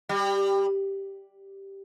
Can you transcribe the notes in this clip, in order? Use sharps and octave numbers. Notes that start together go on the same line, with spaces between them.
G3